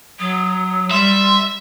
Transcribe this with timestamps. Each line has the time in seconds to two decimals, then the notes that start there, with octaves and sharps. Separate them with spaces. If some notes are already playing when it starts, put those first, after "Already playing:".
0.19 F#3 D#6
0.91 G3 E5 C6